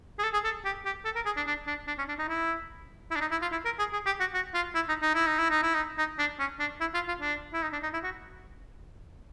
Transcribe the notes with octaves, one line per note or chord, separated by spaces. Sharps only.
G#4
A4
G#4
A4
G4
G4
A4
A#4
G#4
D4
D4
D4
D4
C#4
D4
D#4
E4
E4
D4
D#4
E4
F4
E4
A#4
G#4
G#4
G4
F#4
F#4
F4
E4
D#4
D#4
E4
D#4
E4
D#4
E4
D#4
D#4
D4
C#4
D4
E4
F4
F4
D4
E4
D#4
D4
D#4
E4
F#4